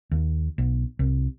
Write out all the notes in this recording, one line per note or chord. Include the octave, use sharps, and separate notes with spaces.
D#2
B1
C2